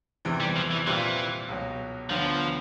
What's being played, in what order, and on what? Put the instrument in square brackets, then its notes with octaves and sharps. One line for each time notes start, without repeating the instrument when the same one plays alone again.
[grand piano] E2 C3 E3
[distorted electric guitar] G3
F3
E3
[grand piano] A#2 G3 C4 F4 [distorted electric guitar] E3
[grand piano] C#2 B2 F#3
[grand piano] D2 D3 F#3 B3 [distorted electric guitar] F3